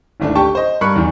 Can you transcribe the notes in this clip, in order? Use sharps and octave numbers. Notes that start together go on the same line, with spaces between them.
D1 G#1 A3 D4
G4 G5 A5 C#6
C5 D#5
G2 A#4 B5 C#6 F#6 C#7
E2 D#3